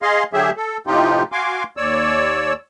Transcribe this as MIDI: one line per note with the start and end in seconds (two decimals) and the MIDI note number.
0.02 0.23 68
0.02 0.23 75
0.02 0.23 77
0.02 0.23 84
0.33 0.50 50
0.33 0.50 54
0.33 0.50 67
0.33 0.50 68
0.33 0.50 76
0.57 0.77 69
0.87 1.23 45
0.87 1.23 48
0.87 1.23 53
0.87 1.23 63
0.87 1.23 65
0.87 1.23 67
1.32 1.64 66
1.32 1.64 77
1.32 1.64 80
1.32 1.64 84
1.32 1.64 86
1.77 2.53 39
1.77 2.53 73
1.77 2.53 74
1.77 2.53 88